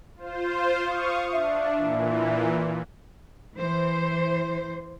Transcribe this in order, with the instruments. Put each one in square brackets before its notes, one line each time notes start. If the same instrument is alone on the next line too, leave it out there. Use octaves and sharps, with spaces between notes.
[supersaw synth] F4 C5
F5 C#6 D#6
[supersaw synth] D4 [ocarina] E5
[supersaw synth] A#2 E3
[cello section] E3 C5